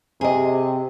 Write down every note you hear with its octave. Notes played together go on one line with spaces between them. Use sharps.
C3 G#4 D#5